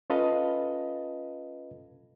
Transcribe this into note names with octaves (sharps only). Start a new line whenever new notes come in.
C#4 F4 A4 B4 D#5 F5